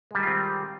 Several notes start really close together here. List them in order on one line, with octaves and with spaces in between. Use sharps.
G#3 G3 D#3 F4 C4